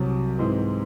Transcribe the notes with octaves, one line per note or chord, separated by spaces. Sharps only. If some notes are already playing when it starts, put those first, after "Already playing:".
Already playing: C2 C3 F#3
G#2 E3 G#3 C4